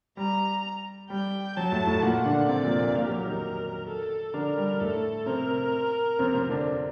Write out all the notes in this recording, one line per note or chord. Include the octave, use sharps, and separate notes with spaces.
G3 A#5
G3 G5
F#3 A5
A2 A3
A2 A3
A#2 A#3 F#5
D3 D4
C3 C4 D5
A#2 A#3
A#2 A#3
A#2 A#3 A#4
G4
F#3 F#4
D#3 D#4
A4
D3 D4 A#4
G3
A2 A3 A4
C3 C4 A#4
C3 C4
C3 C4
D3 D4